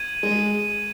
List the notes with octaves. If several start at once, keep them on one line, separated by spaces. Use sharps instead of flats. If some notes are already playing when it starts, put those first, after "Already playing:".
Already playing: G#6 D#7 F#7
G#3